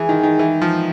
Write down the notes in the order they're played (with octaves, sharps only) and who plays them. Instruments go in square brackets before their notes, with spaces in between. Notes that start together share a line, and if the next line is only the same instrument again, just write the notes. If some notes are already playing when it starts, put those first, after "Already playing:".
Already playing: [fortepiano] E3 [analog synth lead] G#4
[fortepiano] D#3
D#3
E3
F3